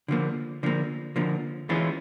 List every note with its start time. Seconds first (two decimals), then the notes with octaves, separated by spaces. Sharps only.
0.08 D3 F3 A#3
0.63 D3 F3 A#3
1.16 D3 F3 A#3
1.69 E3 G#3 C#4 F4